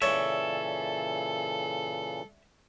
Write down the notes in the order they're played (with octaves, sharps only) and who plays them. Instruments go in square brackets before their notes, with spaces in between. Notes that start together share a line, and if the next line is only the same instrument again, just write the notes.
[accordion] A#2 C#3 E3 [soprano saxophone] A4 [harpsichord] C#5 [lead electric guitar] D5 E5